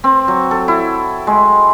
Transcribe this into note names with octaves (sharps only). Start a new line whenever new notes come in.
C4
F#3
A4
E4
G#3